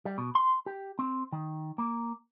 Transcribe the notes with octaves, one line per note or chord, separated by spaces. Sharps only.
G3
B2
C6
G4
C4
D#3
A#3